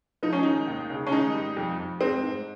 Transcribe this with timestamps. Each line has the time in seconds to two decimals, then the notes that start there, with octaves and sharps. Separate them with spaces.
0.23 F3 D#4
0.33 C#4
0.43 G#2 D#3 D#4
0.67 D#2
0.90 C#3
1.07 C#4
1.12 G#2 D#3 D#4
1.34 G3
1.57 F2
1.79 F2
2.01 G#2 C4
2.23 G#2